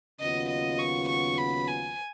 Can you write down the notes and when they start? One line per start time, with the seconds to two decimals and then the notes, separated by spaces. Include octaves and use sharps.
0.20 D#2 C#3 F#3 B3 F4 D#5
0.49 D#5
0.79 C#6
1.09 C#6
1.38 B5
1.68 G#5